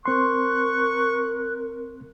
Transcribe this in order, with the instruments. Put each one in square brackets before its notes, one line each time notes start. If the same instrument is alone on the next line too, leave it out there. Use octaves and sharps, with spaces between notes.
[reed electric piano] C4 C6 [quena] A#4 [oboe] C#6 [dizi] F#6